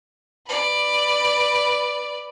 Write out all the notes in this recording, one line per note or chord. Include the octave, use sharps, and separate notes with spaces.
B4 D5